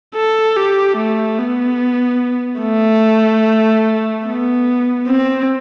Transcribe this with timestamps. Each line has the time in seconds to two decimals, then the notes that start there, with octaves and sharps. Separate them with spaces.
0.15 A4
0.56 G4
0.97 A3
1.38 B3
2.61 A3
4.26 B3
5.07 C4